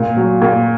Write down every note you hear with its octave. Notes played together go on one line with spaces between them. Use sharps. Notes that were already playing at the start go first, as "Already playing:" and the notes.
Already playing: A#2
F#3
A#2